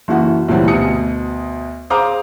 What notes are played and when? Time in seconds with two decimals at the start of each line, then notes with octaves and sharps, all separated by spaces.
0.08 F#1 E3 F#4
0.48 D2 A#2 E3 F#3 G3 C4
0.68 D2 B2 D#6 C#7
1.90 G#4 C5 F5 A#5 D6 D#6